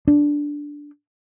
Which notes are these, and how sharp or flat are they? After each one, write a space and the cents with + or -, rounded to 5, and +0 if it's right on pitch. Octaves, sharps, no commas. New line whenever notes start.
D4 -5